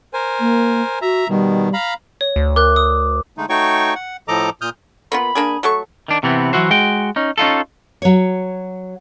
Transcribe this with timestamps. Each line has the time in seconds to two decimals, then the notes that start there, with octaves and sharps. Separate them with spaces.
0.14 A#4 C5 G#5
0.40 A#3
1.02 F#4 E5 A#5
1.29 B2 D#3 G3
1.74 F5 A#5 B5
2.21 C#5
2.36 D2
2.56 A#4 D6 F#6
2.76 D#6
3.37 D3 G#3 A3 D#4
3.49 A3 D#4 F#4 C#5 G5 C#6
3.95 F#5
4.28 A2 F3 A4 D#5 A#5 D6
4.61 A#2 D#6 F6 G6
5.12 A#3 B3 F4 B5
5.35 A#3 D4 G#4
5.63 F#3 A3 C#6
6.08 D#3 D4
6.23 C3 E3 B3 C4
6.53 E3 F#3 E4 F#4 C5
6.71 G#3 F#4 G5
7.16 C#4 D#4
7.38 C#4 D#4 F4 A4
8.02 F#3 C#5